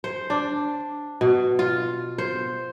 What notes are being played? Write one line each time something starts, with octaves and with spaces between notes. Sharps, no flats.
C5
D4
B2
F4
C5